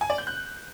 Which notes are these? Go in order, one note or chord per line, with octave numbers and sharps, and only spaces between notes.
G#5
D5
G6
F#6